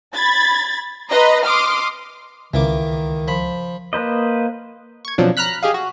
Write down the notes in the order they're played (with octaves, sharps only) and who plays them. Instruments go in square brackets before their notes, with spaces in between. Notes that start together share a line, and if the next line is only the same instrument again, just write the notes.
[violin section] B5 G#6 A6
B4 D#5 A#5 C6
C6 D6 D#6 F6
[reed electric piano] C#2 [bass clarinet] D#3 [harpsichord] E3 A#3 D6
[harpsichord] F3 B5
[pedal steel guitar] A#3 B4 C5 D#5
[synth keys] C#6 G#6
B2 F3 F#3 C4 D4
A#5 B5 F6 F#6 B6
G4 G#4 D#5 F5
F#4